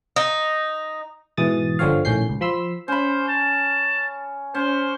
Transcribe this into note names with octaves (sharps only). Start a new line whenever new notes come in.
D#4
G#2 B2 E3 D#6 A6
G1 D3 F3 C4 C#5 F5
A#1 A2 D#3 C#4 G6 C7
C#2
F3 B5 C6 E6
C#4 C5 B5
A5
C#4 C5